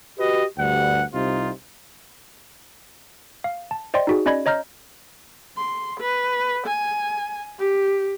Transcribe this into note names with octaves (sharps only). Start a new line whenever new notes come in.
F#4 G4 B4 D#5
D2 G2 G3 F#5
C2 C3 D#4 F4
F5
A5
C5 D5 D#5 G5 C6
D#4 F#4 G#4
C#4 D5 D#5 B5 G#6
C#5 D#5 A#5 F6 G6
C6
B4
G#5
G4